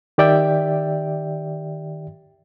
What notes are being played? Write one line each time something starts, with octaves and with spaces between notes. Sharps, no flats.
D#3 G4 D5 E5 G5